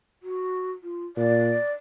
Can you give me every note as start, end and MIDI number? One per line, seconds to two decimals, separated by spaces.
0.23 0.72 66
0.83 1.05 65
1.17 1.55 46
1.17 1.72 74